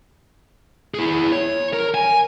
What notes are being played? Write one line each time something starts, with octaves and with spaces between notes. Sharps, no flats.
E4 G#4
C#5
A#4
G#5